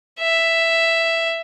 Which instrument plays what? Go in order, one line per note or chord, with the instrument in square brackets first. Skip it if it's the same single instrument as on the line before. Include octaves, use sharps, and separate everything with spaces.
[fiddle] E5